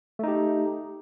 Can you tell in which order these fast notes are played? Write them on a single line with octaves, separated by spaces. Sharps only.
A3 D#4 G4